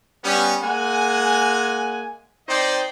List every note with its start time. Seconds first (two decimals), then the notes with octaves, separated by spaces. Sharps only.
0.23 G3 B3 C#4
0.63 G#3 A#3 F#5 G#5
2.48 C4 D#4 C5 D5 D#5 G5